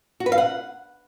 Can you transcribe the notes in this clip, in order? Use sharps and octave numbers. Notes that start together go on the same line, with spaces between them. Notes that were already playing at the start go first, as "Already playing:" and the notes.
F#4
B4
F5
F#5